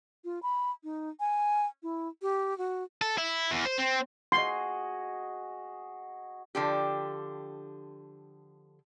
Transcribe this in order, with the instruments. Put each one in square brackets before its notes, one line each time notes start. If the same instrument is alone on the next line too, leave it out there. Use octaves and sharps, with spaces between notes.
[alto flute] F4
B5
D#4
G#5
E4
G4
F#4
[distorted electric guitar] A4
E4
E2
C5
C4
[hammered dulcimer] F#4 G#4 D#5 [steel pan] C6
[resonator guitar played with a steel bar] D3 F3 G4